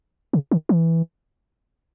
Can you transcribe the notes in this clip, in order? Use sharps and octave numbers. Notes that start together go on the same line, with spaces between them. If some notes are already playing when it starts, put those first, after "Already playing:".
C#3
D#3
E3